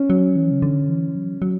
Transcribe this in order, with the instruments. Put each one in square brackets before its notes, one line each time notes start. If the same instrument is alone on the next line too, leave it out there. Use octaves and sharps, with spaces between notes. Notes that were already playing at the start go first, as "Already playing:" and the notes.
Already playing: [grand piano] C#4
[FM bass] F#3
E3
C#3
D3
E3
F#3
F#3